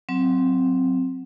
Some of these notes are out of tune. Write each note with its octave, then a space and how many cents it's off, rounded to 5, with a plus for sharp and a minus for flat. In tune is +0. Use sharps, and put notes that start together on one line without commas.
F#3 +0 C4 +0